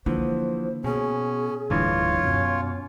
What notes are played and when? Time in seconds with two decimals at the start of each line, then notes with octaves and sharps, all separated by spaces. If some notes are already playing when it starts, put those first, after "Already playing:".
0.06 D3 E3 F3 A#3 C5
0.84 B2 C#4 G#4
1.70 D1 G2 D3 E3 F4 C#5
2.24 F#2 B2 C#4